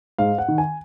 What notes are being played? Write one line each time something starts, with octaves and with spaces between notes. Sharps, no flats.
G#2 F5
F#5
D#3
G#5